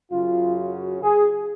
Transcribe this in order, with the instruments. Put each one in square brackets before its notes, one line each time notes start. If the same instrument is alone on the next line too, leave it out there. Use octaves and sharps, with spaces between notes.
[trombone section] F#2 C#3 F#3 F4
F#4
G#4